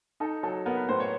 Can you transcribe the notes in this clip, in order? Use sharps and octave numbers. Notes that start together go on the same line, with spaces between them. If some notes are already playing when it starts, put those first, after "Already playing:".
D#4 A4
F#3 A4
B3 A#4
B4
A2 C5
C#5